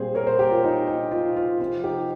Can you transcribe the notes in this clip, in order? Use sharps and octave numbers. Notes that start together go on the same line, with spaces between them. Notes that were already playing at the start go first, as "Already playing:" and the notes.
Already playing: A#2 G3 C4 G#4 C5
A#4 C#5
G#4 C5
G4 A#4
F4
D#4
D#4
F4
F4
C3 F3 C4 F4
D#4 G4